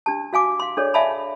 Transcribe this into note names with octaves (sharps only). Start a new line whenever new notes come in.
D4 G4 A5
F#4 F5 G#5 D6
F5 C6
D4 G#4 A4 C#5 D5
D5 E5 F5 G#5 A5 B5